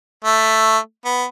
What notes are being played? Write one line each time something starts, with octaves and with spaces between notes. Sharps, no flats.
A3
B3